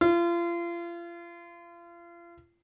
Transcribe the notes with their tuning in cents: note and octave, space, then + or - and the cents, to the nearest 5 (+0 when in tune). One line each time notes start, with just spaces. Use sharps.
F4 -35